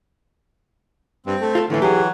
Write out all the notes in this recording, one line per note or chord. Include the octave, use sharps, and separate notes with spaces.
G2 C4
A3
F4 A4
A2 D3 E3 A3
F#3 G4 G#4